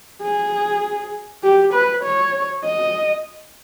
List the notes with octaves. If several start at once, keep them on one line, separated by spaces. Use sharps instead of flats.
G#4
G4
B4
C#5
D#5